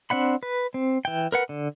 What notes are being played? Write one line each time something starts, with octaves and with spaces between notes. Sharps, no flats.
C4 D4 F#5 B5
B4
C4
E3 G5
A#4 B4 F#5
D3